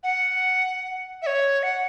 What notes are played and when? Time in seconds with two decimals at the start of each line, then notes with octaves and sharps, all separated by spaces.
0.03 F#5
1.22 E5
1.27 C#5
1.63 F#5